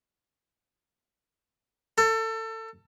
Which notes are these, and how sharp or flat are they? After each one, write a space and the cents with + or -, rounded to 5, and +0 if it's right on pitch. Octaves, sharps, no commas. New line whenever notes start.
A4 +25